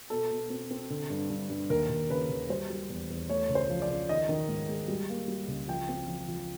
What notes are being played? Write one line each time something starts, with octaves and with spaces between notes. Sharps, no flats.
B2 A4
B2
C4
C4
D3
G2
G2
G2
D#2 A#4
D#2
C#3 B4
D#2
G3 C5
G3
E2
E2
A3 C#5
C#2
C5
F3
D5
C#3
D#3 D#5
D#3
G#2
G#3
G3
A#3
G3
C#2
F3 G5
C4
F3
F3